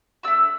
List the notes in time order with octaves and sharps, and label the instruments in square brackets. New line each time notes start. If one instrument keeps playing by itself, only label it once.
[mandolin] A3 D4 F#4 E6